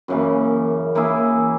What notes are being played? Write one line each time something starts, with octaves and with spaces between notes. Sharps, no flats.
F#2 C#3 E3 A#3
E3 A#3 E4 G#4